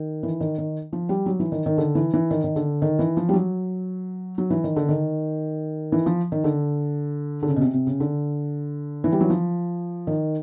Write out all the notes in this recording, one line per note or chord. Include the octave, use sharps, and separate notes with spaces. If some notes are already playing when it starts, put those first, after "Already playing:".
Already playing: D#3
E3
D#3
D#3
F3
G3
F#3
E3
D#3
D#3
D3
E3
E3
D#3
D#3
D3
D#3
E3
F3
G3
F#3
F#3
E3
D#3
D3
D#3
E3
F3
D#3
D3
D3
C#3
B2
C3
C3
C#3
D3
E3
G3
F#3
F3
D#3